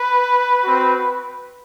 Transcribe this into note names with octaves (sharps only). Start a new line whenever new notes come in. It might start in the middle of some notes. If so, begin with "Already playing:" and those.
Already playing: B4
C4 F#4